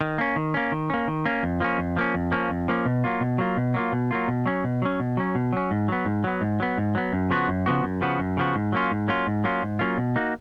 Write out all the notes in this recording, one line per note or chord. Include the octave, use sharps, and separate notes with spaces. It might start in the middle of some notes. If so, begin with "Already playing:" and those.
D#3
A#3 C#4
D#3
A#3 C#4
D#3
A#3 C#4
D#3
A#3 C#4
F2
F3 A#3 C#4
F2
F3 A#3 C#4
F2
F3 A#3 C#4
F2
F3 A#3 C#4
B2
F#3 A#3 F4
B2
F#3 A#3 F4
B2
F#3 A#3 F4
B2
F#3 A#3 F4
B2
F#3 C#4
B2
F#3 C#4
B2
F#3 C#4
B2
F#3 C#4
G#2
F#3 B3
G#2
F#3 B3
G#2
F#3 B3
G#2
F#3 B3
F#2
C#3 F3 B3 F#4
F#2
C#3 F3 B3 F#4
F#2
C#3 F3 B3 F#4
F#2
C#3 F3 B3 F#4
G#2
F#3 A#3 C#4 F4
G#2
F#3 A#3 C#4 F4
G#2
F#3 A#3 C#4 F4
G#2
F#3 A#3 C#4 F4
B2
A#3 D#4 F#4